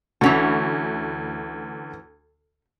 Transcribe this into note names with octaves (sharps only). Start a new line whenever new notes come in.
D2 E3 C#4 F#4